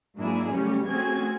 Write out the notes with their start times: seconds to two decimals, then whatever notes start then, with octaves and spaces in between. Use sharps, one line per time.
0.18 G#2 F#3 A#3 D4 E4 G#4
0.52 C#3 F#3 G3 A3 C#4
0.87 A3 C4 C#4 F#4 G#4 G#6